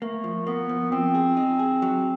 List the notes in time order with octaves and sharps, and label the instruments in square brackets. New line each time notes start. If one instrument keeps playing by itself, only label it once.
[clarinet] A3 [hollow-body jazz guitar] A#3
[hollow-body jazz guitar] F3
[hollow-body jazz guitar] A#3 [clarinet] B3
[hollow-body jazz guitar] F3
[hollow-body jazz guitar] F3 [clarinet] C4
[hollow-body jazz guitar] G#4
D#4
G#4
F#3